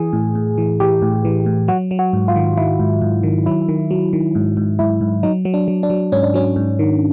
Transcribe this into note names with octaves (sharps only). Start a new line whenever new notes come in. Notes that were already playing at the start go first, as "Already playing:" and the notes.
Already playing: E3 G#4
A2
A2
E3
E3 G4
A2
E3
A2
F#3 F#4
F#3
F#4
G#2
F4
D#3
D#3 E4
G#2
G#2
D#3
F#3 E4
D#3
F#3
D#3
G#2
G#2
G#2 E4
G#2
F#3 D#4
F#3
D4
F#3
D4
F#3
G#2 C#4
D4
F#3 C#4
G#2
D#3